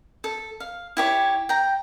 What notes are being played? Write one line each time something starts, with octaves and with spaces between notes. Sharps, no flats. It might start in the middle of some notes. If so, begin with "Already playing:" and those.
A4
F5
E4 G4 C#5
G5 A#5